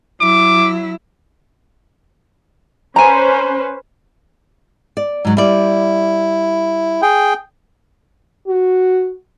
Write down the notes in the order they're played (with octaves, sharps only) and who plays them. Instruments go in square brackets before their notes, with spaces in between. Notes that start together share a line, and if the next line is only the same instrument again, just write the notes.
[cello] F#3 E4 [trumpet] D6
[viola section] C#4 B4 C5 [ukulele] G#5 A#5
[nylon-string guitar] D5
G#2 F#3
[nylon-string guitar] G3 D5 [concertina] E4
[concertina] G#4 G5
[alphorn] F#4